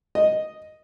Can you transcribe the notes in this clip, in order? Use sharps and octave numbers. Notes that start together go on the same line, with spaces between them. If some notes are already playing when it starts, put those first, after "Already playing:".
D#5